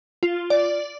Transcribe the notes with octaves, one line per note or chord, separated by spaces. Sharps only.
F4
D5